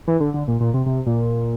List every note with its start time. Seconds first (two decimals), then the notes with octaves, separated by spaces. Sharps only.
0.08 E3
0.20 D3
0.34 D3
0.48 A#2
0.61 A#2
0.74 C3
0.86 C3
1.06 A#2